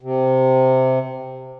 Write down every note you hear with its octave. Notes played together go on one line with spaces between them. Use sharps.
C3